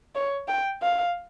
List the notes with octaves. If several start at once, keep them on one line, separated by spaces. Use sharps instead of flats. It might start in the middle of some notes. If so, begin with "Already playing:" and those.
C#5
G5
F5